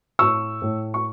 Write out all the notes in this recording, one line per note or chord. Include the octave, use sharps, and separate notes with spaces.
A2 C#6 E6
A2
C#6